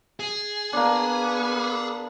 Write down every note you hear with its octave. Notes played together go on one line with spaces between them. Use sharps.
G#4
A#3 B3 D4